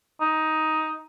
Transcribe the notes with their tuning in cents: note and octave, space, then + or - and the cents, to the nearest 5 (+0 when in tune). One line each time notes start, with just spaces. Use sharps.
D#4 +10